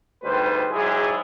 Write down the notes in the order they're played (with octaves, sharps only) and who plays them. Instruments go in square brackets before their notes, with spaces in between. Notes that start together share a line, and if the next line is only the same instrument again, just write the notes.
[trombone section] G#1 D2 D#3 G3 B4 C5
G#2 F#3 E4 G4 G#4